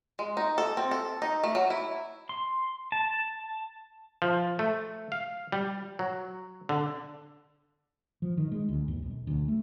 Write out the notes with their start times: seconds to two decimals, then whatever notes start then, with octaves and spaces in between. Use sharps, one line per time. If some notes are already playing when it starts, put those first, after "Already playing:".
0.19 G#3
0.37 D#4
0.58 A4
0.77 C4
0.91 A4
1.22 D#4
1.44 A3
1.55 F#3
1.70 E4
2.29 C6
2.92 A5
4.22 F3
4.59 A3
5.12 F5
5.52 G3
5.99 F#3
6.69 D3
8.22 F3
8.37 D#3
8.52 G#3
8.69 D2
8.88 D#2
9.02 B1
9.27 D2
9.48 A3